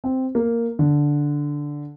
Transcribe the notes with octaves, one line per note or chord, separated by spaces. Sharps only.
C4
A#3
D3